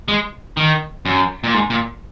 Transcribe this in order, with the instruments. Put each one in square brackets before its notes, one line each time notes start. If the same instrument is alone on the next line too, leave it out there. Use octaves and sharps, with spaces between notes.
[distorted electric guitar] G#3
D#3
F#2
A#2
G#2
A#2